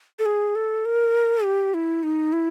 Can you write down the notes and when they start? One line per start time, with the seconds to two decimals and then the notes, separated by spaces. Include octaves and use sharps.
0.19 A4
0.26 G#4
0.55 A4
0.85 A#4
1.44 G4
1.74 E4
2.03 D#4
2.33 E4